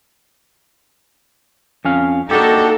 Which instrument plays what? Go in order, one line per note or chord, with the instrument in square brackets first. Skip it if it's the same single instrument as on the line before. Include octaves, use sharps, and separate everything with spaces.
[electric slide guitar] F2 C#4 F5
[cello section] A#3 D#4 A4 [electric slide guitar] D4 F#4 G4